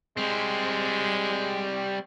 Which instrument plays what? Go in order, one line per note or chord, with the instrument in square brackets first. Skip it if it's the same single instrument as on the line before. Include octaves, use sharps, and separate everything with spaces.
[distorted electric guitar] G3 C4 [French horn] G#3